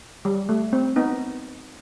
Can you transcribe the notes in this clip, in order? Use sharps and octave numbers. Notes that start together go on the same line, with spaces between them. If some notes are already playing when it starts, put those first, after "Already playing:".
G3
A3
C4
B3 D#4